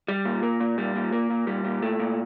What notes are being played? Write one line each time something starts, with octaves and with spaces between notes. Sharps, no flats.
G3
A#2
A#3
A#2
G3
A#2
A#3
A#2
G3
A#2
A3
A#2